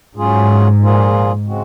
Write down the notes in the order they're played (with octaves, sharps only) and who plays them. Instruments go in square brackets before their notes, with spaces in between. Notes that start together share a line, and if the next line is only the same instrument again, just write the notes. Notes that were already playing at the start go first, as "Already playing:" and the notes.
[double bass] G#2 [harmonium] F#3 C#4 F4 G#4
[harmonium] A#2 F3 A#3 F4 G#4
C#3 G#3 C4 F#4